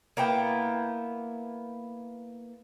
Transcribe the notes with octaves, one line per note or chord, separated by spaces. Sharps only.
A#3 B3 E4 G5